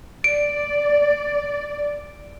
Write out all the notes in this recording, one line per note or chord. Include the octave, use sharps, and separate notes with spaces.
D5 D7